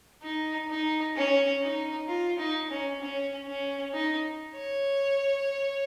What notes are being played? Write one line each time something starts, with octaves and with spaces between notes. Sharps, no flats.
D#4
D#4
C#4
D#4
F4
D#4
C#4
C#4
C#4
D#4
C#5